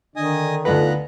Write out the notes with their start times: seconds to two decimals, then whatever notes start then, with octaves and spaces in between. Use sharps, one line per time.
0.16 D3 D#3 D4 D#5 G#5 D#6
0.65 D2 B3 D#4 F4 A4 B4 A#5 F#6